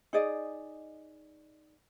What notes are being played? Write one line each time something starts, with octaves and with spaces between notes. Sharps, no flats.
D#4 G#4 D5 D#5